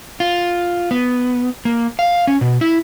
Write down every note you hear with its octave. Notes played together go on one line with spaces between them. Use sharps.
F4
B3
A#3
F5
C#4
B2
E4